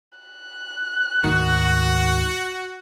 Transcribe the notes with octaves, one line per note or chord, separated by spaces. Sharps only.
F#6
D2 G#2 D#3 F#4